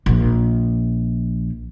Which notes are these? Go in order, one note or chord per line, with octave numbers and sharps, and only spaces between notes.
A#1 F3